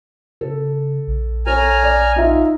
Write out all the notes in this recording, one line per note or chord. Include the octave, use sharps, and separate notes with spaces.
C#3 A4
A#1
A4 C#5 G#5 A#5 F6
D5
D#4 F4 E5